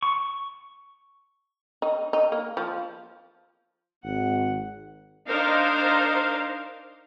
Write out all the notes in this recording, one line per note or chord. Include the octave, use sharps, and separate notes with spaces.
C#6
D#4
D#4
A#3
F3
G#1 F#5
D4 D#4 A#4 C5 F5